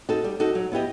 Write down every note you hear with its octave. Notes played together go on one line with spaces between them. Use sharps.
D#4 F#4 A4
G3
D#4 F#4 A4
F#3
B3 E4 G4 D#5